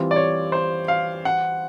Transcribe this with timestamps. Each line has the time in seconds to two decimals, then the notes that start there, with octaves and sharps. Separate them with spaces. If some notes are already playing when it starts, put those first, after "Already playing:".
Already playing: E3 G3 C4 F4
0.11 D5
0.16 C#5
0.52 C5
0.88 F5
1.25 F#5